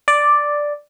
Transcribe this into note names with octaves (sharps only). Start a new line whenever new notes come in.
D5